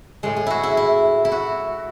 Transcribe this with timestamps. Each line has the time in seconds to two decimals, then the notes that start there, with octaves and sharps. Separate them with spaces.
0.23 A2 G#3 G#4
0.36 G#4
0.47 E4 F#4
0.63 E4
0.77 E4
1.25 E4
1.32 F#4